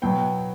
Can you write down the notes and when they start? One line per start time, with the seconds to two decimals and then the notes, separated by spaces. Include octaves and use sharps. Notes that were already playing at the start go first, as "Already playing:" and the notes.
0.02 B2 F#3 B3 G5